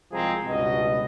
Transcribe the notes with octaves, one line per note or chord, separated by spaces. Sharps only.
C2 F3 G#3 C4 G#4 A#5
C#2 G2 B2 D#5